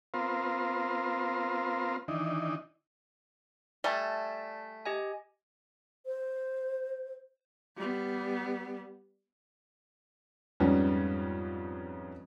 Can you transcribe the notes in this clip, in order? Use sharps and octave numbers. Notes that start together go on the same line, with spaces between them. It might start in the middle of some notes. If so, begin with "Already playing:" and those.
B3 C4 F4 A#4 C5
D#3 E3 D4 D#4
G3 A3 D5 G#5 A5
G4 D#5 G#5
C5
G3 B3
F2 G#2 G3 B3 C#4